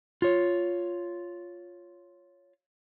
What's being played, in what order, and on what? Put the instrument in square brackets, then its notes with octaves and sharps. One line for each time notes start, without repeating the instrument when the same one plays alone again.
[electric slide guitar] F4 C#5